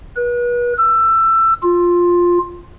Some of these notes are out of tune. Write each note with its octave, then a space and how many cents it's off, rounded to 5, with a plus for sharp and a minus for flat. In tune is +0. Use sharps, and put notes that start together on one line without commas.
B4 -35
E6 +20
F4 +5